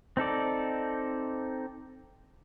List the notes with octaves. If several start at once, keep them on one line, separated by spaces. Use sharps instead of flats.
C4 D#4 A4 D5